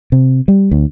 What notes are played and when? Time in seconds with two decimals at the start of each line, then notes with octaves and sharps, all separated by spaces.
0.12 C3
0.48 G3
0.71 D2